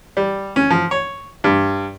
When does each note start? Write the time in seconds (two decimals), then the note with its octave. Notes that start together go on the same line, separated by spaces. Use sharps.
0.17 G3
0.56 C#4
0.70 F3
0.91 C#5
1.44 G2